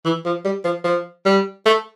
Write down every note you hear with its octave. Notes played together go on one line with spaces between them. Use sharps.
E3
F3
G3
F3
F3
G3
A3